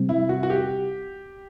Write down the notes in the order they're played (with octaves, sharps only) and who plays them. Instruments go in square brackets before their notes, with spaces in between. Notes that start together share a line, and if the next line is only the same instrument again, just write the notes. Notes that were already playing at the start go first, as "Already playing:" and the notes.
Already playing: [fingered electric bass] C3 G3 C4
[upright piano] E4
F#4
F#4
G4